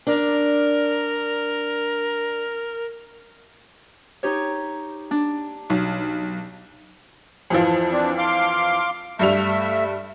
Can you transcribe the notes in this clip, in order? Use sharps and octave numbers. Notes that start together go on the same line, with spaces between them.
D4 A#4 D5
D#4 G4 C#5
D4
B1
F2 E3 F3
C4 D4
F5 C6 D6
G2 G3 A3 E5 F7